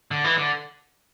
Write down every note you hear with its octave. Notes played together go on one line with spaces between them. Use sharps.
D3
E3
D3